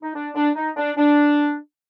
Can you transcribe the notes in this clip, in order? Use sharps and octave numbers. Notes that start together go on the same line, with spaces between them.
D#4
D4
D4
D#4
D4
D4